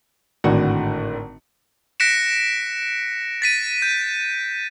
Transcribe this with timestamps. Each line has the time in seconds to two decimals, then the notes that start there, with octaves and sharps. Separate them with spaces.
0.44 G#1 A2 D3 F#4 F#5
2.00 F#6 A#6 B6 C#7 D7 E7
3.42 A6 B6 D#7
3.82 G6